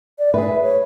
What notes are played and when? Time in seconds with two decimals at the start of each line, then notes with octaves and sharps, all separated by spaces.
0.19 D5
0.34 G#4 B4 E5
0.63 C#5